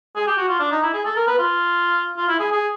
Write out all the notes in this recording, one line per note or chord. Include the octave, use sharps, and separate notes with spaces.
G#4
G4
F#4
F4
D4
D#4
E4
G#4
A4
A#4
B4
F4
F4
E4
G#4
G#4